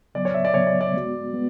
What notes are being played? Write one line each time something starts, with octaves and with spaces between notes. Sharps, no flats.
C#3 F#3 B3 D5
C#5
E5
D5
C#3 F#3 B3 C#5
D5
D5
G#3 B3 F#4
G#3 B3